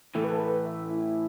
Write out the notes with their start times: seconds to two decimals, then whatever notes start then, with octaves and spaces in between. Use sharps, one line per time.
0.15 A2 E3 A3 A4
0.24 B4
0.31 A4
0.40 B4
0.65 E5
0.90 E4